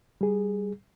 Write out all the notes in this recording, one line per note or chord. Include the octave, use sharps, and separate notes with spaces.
G3 G#4